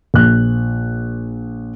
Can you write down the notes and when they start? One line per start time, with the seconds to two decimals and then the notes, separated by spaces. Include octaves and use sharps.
0.14 A#1 F#6